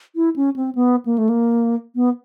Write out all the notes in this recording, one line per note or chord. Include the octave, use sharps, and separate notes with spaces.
E4
C#4
C4
B3
A#3
A3
A#3
B3